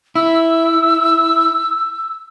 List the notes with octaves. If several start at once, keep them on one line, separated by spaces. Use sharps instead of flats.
E4 E6